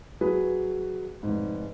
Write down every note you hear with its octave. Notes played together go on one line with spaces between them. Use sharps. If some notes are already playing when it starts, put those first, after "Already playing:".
F#3 G#4 B4
F1 G#2